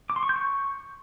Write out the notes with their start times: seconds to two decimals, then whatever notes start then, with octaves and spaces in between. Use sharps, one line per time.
0.10 D6
0.16 C6
0.23 C#6
0.29 G6
0.36 C#6